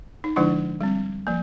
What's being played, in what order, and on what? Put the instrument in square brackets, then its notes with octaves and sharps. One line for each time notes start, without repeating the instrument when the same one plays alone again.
[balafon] D#4
D3 F3 G#3 D4 E4
G3 C4
F3 A#3